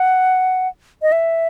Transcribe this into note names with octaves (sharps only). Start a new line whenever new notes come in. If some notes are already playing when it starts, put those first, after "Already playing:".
Already playing: F#5
D#5
E5